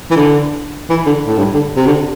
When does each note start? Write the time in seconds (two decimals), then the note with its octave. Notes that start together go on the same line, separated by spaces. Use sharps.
0.11 E3
0.16 D3
0.90 E3
1.06 D3
1.26 A2
1.38 G2
1.54 D3
1.76 C3
1.87 D3